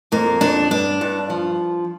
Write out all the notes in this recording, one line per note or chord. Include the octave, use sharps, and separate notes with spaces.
F2 A#3
F2 D4
G2 D4
G2
F3